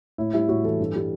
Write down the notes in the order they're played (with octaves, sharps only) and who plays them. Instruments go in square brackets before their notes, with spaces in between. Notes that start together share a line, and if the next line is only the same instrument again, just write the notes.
[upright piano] A2 E4
G3 E4
A2 F#4
E3 A4
G2
G3